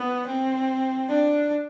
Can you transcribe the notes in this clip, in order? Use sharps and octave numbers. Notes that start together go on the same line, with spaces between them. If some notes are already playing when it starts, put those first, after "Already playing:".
Already playing: B3
C4
D4